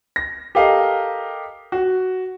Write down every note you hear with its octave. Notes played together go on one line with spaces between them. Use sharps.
A#6
G4 A4 A#4 D#5 F5
F#4